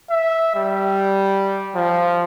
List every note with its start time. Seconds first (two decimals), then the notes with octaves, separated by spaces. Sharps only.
0.10 E5
0.55 G3
1.75 F3